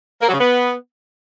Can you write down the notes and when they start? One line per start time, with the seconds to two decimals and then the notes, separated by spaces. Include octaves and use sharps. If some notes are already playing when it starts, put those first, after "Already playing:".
0.21 A#3
0.27 F#3
0.33 C#3
0.39 B3